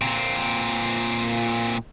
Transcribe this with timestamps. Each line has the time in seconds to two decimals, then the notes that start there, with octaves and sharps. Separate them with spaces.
0.01 A#2 C4